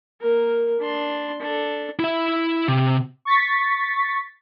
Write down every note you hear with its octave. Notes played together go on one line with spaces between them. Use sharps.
A#3 A#4
D4 C6
D4 A4
E4 E5
C3
C#6 A6 B6